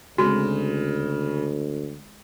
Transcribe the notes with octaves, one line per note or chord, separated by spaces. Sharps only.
D2 C#3 G#3 C4 F#4